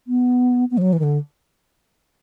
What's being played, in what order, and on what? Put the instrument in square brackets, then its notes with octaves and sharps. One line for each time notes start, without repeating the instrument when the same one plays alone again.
[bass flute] B3
B3
F3
F#3
E3
D#3
D3